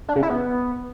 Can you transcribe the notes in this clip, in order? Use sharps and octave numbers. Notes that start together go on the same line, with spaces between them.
D4
C#3
E4
B3